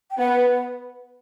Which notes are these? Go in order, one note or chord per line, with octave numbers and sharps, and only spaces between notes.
G5
B3 F#5